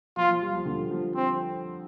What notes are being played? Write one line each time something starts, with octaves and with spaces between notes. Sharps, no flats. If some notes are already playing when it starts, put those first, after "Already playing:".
F3 F4
F3
G3
F3
D3
F3
C4